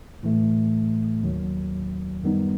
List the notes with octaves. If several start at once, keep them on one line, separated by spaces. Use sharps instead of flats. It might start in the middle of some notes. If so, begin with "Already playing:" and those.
A2 E3 A3
D#2 D#3 F#3
F#2 D#3 G3 B3 D#4